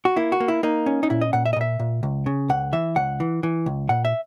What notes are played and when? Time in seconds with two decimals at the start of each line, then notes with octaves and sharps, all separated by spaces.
0.05 F#4
0.16 A#3 E4
0.32 F#4
0.40 A#3
0.48 E4
0.63 A#3 D#4
0.86 C#4
1.03 D#4
1.10 A#2 E4
1.21 D#5
1.33 A#2 F#5
1.46 E5
1.53 D#5
1.56 A#2 E5
1.79 A#2
2.03 C#2
2.26 C#3
2.49 C#2 F#5
2.73 E3 E5
2.96 C#2 F#5
3.20 E3
3.43 E3
3.66 C#2
3.89 A#2 F#5
4.05 E5